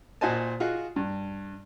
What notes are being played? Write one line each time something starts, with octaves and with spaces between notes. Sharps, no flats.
A#2 F#4 C5 D#5 G#5 A5
F4 F#4 G#4 D#5 F#5
G2